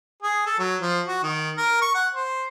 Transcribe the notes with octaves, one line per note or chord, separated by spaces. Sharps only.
G#4
A4
F#3
F3
F#4
D#3
A#4
C#6
F#5
C5